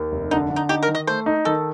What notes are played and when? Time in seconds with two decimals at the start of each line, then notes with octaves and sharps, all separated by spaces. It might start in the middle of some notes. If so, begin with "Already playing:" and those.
Already playing: D#2
0.12 F1
0.31 D3 D#4
0.50 D3
0.56 D#4
0.69 D#4 G4
0.83 A#4
0.88 D#3
0.95 D#5
1.07 A3 C5
1.26 D#4
1.45 D#3 A4